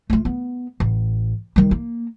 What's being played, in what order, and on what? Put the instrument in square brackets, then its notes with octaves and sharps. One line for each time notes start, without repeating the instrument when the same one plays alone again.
[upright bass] A3 F4
B3
A1
D#3 G3
A#3